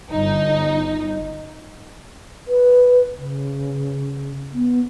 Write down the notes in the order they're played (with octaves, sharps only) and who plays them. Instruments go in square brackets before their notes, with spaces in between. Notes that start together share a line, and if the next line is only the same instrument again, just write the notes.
[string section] G1 D#4
[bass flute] B4
C#3
B3